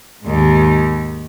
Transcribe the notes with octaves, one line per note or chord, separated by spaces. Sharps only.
D#2 G#2